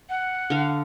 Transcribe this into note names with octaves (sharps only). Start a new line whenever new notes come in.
F#5
D3 F5